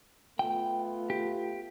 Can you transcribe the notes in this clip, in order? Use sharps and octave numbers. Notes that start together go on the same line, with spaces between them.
A3 B3 F4 G5
G4